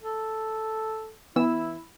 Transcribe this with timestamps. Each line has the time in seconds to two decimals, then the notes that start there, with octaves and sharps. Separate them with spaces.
0.01 A4
1.36 E3 B3 E4 E6